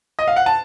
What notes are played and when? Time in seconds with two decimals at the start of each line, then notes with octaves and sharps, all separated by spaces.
0.19 D#5
0.28 F5
0.36 F#5
0.46 A5